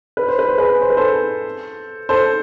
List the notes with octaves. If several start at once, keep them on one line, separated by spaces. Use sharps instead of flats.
B4
C5
B4
C5
G#4 B4
C5
B4
A4 C5
A4 C5